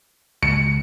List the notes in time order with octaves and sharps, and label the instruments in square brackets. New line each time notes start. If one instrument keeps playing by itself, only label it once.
[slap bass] C#2 [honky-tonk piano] C#7